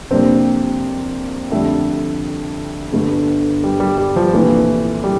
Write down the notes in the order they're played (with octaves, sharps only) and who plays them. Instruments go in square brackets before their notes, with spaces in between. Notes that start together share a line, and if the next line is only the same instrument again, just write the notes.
[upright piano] F2 C3 G3 A#3 D4 [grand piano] C4
[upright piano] F2 D3 G3 D4 [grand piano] A3
[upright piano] G1 G2 D3 A3
[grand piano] G3
G3
G3
F3
[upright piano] C2 A#2 A3 D4 G4 [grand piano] E3
[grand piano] G3